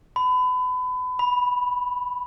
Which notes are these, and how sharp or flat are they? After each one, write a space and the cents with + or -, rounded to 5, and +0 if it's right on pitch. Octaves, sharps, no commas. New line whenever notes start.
B5 +30
B5 -5